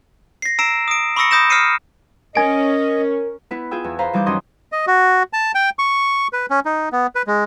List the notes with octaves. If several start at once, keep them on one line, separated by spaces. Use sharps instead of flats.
A#6 C7
A#5 E6 C7 D7 E7
D#6 D7
B5 C#6 D#6 E6 A#6 C#7
B5 D#6 G6 A#6 E7
D#6 F6 A#6 C7 C#7 D#7
C#4 A#4 D#5 G#5 D7
B3 E4 B4
F4 G#4 G5 E6
E2
B4 C5 F5 A#5 B5
E3 G3 D#4 D6 F#6 G6
F#2 D#3 C#4 D#5 C6 D#6
D#5
F#4
A5
G5
C#6
B4
C#4
D#4
B3
B4
G#3